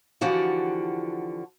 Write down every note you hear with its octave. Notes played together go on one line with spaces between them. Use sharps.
D3 E3 F3 F#4 G4